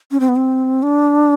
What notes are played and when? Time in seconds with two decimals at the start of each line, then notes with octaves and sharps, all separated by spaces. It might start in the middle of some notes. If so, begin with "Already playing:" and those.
0.11 C#4
0.20 C4
0.28 B3
0.36 C4
0.83 D4